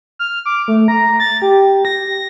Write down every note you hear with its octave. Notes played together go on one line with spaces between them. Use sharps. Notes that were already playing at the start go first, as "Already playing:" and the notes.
F6
D6
A3
A#5
A6
G4
A#6